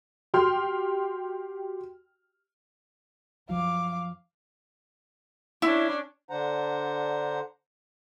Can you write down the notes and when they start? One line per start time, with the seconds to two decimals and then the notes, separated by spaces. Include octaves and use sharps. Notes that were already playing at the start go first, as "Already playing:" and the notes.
0.34 F#4 G4 G5 C6 F6
3.49 F#2 F3 F5 D6
5.62 C#4 D4 E4
6.30 D3 D4 C5 F#5 A#5